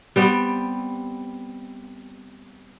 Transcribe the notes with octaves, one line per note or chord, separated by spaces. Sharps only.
G3 B3 C4